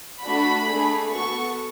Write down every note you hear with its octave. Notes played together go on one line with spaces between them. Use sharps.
A3 D4 F#4 B5
A3 D4 G#4
B3 F#4 A4 C#6